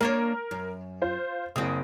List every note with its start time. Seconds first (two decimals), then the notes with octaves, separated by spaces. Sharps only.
0.01 A#3 D4 A#4 C#5
0.51 F#2
1.02 F4 C5
1.56 F#1 C#3 C4 D#6